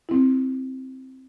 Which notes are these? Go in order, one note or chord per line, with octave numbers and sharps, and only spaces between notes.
C4 E4